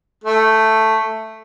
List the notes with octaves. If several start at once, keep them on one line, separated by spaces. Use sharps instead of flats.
A3